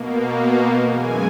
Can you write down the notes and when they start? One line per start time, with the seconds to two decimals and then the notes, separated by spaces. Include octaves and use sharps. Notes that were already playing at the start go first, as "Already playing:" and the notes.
Already playing: B2 A#3
0.89 F#2 E3 G#3 G#5